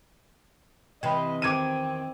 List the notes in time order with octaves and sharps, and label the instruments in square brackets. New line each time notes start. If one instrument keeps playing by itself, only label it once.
[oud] C3 E3 [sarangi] D#5 [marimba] G5 B5
[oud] E2 D#3 [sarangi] C4 [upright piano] D6 G#6 D#7